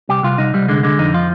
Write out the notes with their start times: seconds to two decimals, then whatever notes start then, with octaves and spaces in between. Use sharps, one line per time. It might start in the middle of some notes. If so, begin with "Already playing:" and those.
0.09 C2 G4
0.23 C2 F4
0.38 C2 D#4
0.54 C2 G3
0.69 D3 G#3
0.83 D3 G#3
0.99 F2 D#4
1.14 F3 F4